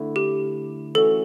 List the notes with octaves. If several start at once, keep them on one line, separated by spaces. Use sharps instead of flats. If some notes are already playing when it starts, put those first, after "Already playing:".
Already playing: D3 A3 E4
G4
E3 A3 C#4 F#4 A4